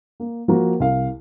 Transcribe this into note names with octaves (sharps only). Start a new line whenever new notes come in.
A#3
F3 A#3 F#4 A#4
C2 F5